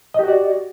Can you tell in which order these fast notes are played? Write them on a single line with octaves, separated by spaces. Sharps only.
D#5 G4 F#4 D5